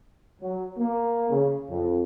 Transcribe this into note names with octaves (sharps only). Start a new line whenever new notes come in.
F#3
A#3
C#3
F2